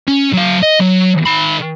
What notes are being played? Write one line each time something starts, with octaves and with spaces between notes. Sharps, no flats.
C#4
F#3 F5
D#5
F#3
D#3 B5